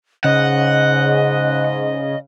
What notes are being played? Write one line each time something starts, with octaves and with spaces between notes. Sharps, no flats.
G#2 C#3 D#5 F#5